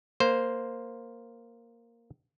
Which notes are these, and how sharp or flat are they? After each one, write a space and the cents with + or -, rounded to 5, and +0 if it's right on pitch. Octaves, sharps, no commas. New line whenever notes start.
A#3 +0 C5 +0